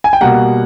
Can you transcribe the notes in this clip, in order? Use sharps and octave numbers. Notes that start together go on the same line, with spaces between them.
G#5
G5
B2 G3 A#3 F#5